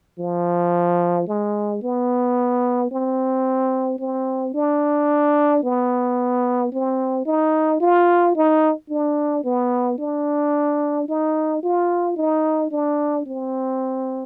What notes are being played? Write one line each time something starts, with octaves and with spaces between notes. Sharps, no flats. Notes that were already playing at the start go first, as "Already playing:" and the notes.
F3
G#3
B3
C4
C4
D4
B3
C4
D#4
F4
D#4
D4
B3
D4
D#4
F4
D#4
D4
C4